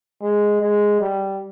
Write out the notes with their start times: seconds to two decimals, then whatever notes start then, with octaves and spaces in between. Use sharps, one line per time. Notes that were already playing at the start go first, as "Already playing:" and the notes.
0.22 G#3
0.61 G#3
1.01 G3